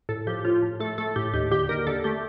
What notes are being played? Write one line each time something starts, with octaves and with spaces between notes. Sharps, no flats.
A2 A4
F3 G4
A2 F4
A2
A3 A4
A3 A4
A2 G4
D#2 G4
D3 G4
D#2 A#4
D3 A4
A3 G4